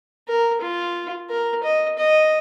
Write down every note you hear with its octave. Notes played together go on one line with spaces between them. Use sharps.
A#4
F4
A#4
D#5
D#5